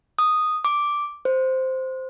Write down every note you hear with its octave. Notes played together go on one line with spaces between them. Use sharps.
D#6
D6
C5